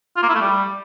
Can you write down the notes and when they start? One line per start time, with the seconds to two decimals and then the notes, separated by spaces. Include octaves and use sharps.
0.17 F4
0.23 A#3
0.29 E4
0.35 A3
0.41 G3